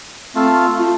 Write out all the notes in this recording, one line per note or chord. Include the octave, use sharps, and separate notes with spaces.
A3 C4 F4 A4 F5
F4